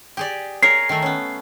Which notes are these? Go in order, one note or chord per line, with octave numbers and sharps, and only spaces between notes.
G4 G#4 D5
G#4 A#4 C#5 C7
D#3 A3
B3 C#4